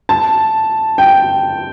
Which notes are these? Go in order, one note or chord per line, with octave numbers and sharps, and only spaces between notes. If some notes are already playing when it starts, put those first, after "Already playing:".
A5
G5